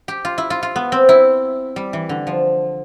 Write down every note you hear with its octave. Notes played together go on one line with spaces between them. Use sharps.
G4
F4
E4
F4
F4
B3
C4
E4
G3
E3
D3
F3